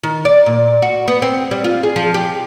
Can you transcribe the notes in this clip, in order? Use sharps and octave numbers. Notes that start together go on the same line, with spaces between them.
D#3
D5
A#2
F#4
B3
C4
G3
F4
G#4
F3
G4